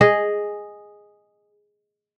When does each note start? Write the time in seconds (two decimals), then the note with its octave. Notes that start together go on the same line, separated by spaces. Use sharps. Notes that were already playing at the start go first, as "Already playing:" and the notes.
0.01 G#4 D#5